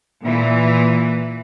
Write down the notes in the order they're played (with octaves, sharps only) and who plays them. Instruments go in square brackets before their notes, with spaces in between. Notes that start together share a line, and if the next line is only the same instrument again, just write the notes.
[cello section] A#2 E3